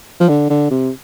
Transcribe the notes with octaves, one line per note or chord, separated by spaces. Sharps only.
F3
D3
D3
C3